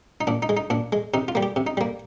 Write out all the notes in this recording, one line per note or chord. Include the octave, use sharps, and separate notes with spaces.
D#4
A#2 D4
D#4
G#3
D#4
A#2 D4
G#3
C3 D#4
F4
G3 A#3
G4
C3
D#4
G3 A#3